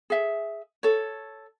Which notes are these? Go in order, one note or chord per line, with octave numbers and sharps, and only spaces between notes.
G#4 E5
A4 C#5